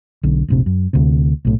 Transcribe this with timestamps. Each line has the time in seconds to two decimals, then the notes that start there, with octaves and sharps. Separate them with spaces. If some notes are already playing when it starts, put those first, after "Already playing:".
0.23 B1 D3
0.48 F1 A#1 C3
0.66 F#2
0.93 D2 C3
1.45 B1 A2